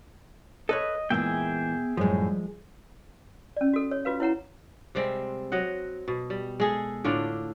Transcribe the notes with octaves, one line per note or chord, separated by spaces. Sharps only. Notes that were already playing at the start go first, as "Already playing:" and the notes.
A4 B4 C#5 D#5
A#2 E3 G#3 B3 G#4 E5 G5
F#2 A2 F3 G3 G#3
C#4 D5
F#4 A4
C#5
F4 F#4 B4 F5
E4 C#5 F#5 A#5
C3 G3 G#3 C4
F#3 D#5 F#5
B2
G3
G#3 G#4 A4
A2 D3 D4 F4